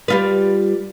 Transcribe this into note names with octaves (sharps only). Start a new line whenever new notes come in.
G3 F4 B4